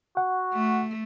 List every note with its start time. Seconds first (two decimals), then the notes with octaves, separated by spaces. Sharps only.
0.17 F#4 F#5
0.54 A3